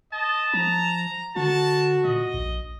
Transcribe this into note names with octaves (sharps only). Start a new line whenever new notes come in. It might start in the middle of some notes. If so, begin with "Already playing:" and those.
D#5 A5
F3 A#5
D3 F#4 A5
A#2 D#5
A#1